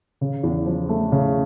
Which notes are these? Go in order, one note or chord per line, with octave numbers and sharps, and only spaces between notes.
C#3
E2
F3
A3
C#3